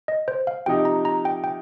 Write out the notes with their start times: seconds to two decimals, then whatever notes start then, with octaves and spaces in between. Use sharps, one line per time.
0.08 D#5
0.28 C5
0.47 F5
0.66 C3 F3 D#4 G4 G5
0.85 A#5
1.05 A#5
1.25 G5
1.44 G5